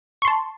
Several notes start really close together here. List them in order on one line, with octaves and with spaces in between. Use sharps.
C#6 C6 A5